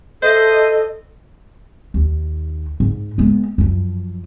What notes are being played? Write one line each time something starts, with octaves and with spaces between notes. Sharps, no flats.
A4 C5 D#5 E5 G6
D#2
G#2
G#3 B3
F#2 F3